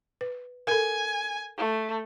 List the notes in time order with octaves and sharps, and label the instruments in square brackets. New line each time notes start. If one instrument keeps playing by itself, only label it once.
[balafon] B4
[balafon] A4 A#4 [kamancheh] G#5
[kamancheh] A3